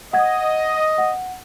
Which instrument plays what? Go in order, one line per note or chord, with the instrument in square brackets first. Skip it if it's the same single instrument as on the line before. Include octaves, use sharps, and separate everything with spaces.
[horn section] D#5 [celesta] F#5 G#6
[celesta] F#5